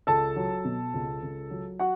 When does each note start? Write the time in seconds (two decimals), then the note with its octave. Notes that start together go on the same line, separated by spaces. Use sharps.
0.07 C#2 A4 A5
0.36 F#3
0.65 B2
0.94 C#2
1.22 C#2
1.51 F#3
1.79 F#4 F#5